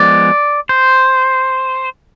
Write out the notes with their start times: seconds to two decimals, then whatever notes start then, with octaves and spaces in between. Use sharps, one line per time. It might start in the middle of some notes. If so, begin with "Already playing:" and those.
Already playing: F3 G#3 B3 D5
0.69 C5